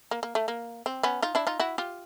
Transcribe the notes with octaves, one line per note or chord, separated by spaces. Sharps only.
A#3
A#3
A3
A#3
C4
B3 C#4
D#4 F4
D4 E4
D#4 F4
E4 F#4
F4 G4